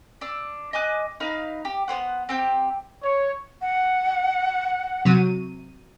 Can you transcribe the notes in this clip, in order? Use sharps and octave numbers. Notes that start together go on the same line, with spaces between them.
D4 E6
D#5 G#5 D6 F#6
D#4 B4 F5 A#5
G4
B3 C#4 C5 F#5
C4 G4 G6
C#5
F#5
C3 F#3 D#7